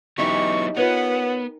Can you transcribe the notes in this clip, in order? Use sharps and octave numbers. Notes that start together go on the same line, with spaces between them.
F#3 B3 C#4 D#4 E4 G4 C#6
B3 F4 A#4 B4 C#5 F#5